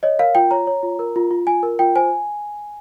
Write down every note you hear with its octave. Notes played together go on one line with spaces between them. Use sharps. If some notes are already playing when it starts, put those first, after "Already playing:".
C#5 D#5
A#4 F5
F4 G5
C#5 A#5
C#5
F4
A#4
F4
F4
F4 G#5
A#4
F4 G5
C5 G#5